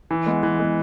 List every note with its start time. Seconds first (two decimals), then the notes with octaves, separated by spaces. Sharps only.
0.11 E3
0.26 G#3 B3
0.43 E3
0.59 G#3 B3